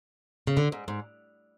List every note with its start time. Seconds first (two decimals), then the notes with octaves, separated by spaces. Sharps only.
0.47 C#3
0.57 D3
0.72 G#2
0.88 G#2